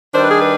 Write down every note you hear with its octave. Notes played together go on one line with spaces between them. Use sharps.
D#3 G3 D4 C5
B4
G#4
B4